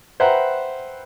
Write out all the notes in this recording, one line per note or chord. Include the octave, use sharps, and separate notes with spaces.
B4 C5 E5 F#5 G5 A#5